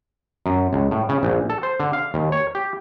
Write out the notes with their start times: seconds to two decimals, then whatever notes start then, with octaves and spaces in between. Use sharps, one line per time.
0.46 F#2
0.73 C#2
0.91 A2
1.09 C#3
1.23 A#1
1.50 A4
1.63 C5
1.80 D3
1.93 F5
2.14 D#2
2.32 C#5
2.55 G4